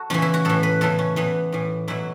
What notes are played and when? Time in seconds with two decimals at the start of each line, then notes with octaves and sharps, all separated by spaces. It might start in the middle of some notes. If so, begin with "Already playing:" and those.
Already playing: F#4 A4
0.10 E2 C#3 E3 C#4
0.22 E4
0.34 F#4
0.45 A2 E3 A4
0.63 B4
0.81 E2 C#3 E3 A4
0.99 C#4
1.16 E2 E3 B3
1.52 A2 E3
1.88 E2 B2 F#3 E4